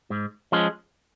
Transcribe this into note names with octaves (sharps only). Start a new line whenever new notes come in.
G#2
F3 G#3 C#4